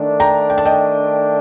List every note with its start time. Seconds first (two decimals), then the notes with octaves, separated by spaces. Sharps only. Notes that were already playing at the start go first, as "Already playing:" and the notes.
Already playing: D#3 A3 D4
0.20 G5 A#5
0.50 G5
0.58 A5
0.66 D#5 G5